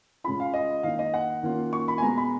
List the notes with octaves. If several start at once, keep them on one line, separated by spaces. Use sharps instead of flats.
C#3 G#3 C#4 F4 B5
F5
D#5
D#3 A#3 D#4 F5
D#5
F#5
D#3 A#3 C#4 F4
C#6
B5
G#5
B2 G#3 B3 A#5
B5